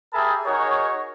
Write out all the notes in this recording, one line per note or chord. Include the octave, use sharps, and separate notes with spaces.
G4 G#4 A#4 E5 A5 B5
D#4 F#4 G#4 A#4 C#5